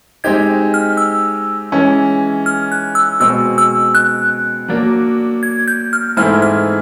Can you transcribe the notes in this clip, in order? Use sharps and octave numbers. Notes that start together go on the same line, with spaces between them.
G#3 C4 D#4 G4 G#6
F6
E6
E3 G#3 C#4
F6
F#6
E6
B2 G#3 C4 E6
E6
F#6
F#3 A#3 D4
G#6
G6
F6
G#2 E3 A3 C4 E4 F6
F6